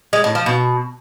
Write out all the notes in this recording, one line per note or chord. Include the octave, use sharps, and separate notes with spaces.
G#3
A2
F3
B2